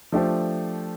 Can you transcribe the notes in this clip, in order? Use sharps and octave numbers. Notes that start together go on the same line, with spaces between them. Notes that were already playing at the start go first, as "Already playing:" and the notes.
F3 A3 D4 G4 C5